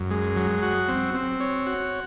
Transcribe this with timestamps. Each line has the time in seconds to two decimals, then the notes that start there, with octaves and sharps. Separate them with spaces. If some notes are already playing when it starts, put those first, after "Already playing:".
Already playing: F#2
0.11 G#3
0.36 F#3
0.63 F#4
0.88 C4
1.14 C4
1.40 C#5
1.67 F#4